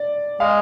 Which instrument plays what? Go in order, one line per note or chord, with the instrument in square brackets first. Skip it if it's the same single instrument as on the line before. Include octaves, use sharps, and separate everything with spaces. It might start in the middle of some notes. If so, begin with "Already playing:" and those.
Already playing: [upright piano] D5
[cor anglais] G#3 [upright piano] F5